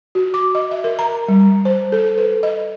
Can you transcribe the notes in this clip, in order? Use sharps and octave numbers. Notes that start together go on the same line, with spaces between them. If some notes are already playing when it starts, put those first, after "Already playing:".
F#4
D6
D#5
E5
A#4
A#5
G3
C5
A4
B4
D#5